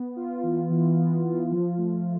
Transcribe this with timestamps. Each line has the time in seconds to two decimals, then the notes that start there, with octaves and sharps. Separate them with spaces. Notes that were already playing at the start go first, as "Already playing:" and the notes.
Already playing: B3
0.16 F4
0.43 E3
0.70 E3
0.98 B3
1.24 F4
1.52 F3
1.78 A3